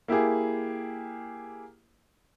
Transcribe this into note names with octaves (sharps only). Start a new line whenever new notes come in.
A#3 E4 G4 G#4